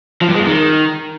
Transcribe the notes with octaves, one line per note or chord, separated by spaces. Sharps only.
F3
G2
G#3
E2
D#3